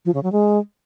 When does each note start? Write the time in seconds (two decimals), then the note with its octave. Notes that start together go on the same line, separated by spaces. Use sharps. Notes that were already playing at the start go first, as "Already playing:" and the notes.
0.05 F3
0.14 C#3
0.23 F#3
0.32 G#3